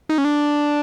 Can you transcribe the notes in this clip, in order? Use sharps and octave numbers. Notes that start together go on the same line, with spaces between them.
D#4
C#4
D4